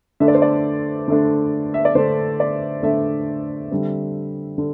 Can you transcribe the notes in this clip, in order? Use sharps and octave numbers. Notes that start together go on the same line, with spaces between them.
D3 A3 D4 E5
D5
C5
D5
D3 A3 D4
E5
D5
D3 A3 D4 C5
D5
D3 A3 D4 E5
D3 G3 C4
D3